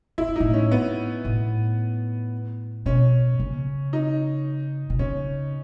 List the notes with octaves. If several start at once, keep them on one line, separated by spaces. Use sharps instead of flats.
A2 E4
G#2
A2 D#4
C#4
B3
A2
B2 C#4
C#3
D#4
B2
C#3 C#4